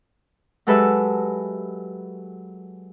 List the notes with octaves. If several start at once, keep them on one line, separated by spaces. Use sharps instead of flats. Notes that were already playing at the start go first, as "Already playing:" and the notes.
F#3 G#3 G4 A4 B4 E5